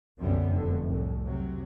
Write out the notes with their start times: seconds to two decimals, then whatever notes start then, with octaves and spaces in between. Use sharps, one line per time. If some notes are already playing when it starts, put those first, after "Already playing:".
0.19 C2 F#2 D3 G3 B3
0.50 F1 D3
0.86 C2 A2
1.24 C3 F#3